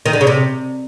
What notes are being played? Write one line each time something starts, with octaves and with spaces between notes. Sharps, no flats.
D#3
D3
C#3
C3